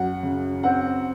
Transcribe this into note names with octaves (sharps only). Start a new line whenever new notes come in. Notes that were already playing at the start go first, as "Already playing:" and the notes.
Already playing: F#2 F#5
C#3
C4 F#5